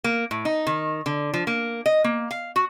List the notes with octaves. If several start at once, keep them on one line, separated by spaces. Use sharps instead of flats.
A#3
A2
D#4
D#3
D3
F3
A#3
D#5
A#3
F5
F#4